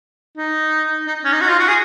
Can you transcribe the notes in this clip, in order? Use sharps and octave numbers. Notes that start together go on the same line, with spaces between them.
D#4
D#4
C#4
D#4
F#4
F4
F#4
G#4